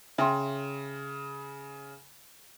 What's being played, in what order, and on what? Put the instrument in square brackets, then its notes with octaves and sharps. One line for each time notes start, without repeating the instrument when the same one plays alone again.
[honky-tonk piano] C#3 [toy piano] E5 G5 C6